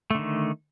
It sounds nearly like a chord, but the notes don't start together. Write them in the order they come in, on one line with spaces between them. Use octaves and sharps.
A3 D3 D#3